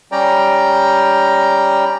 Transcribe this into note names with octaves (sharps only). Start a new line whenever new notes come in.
G3 C#4 D5 G5 A#5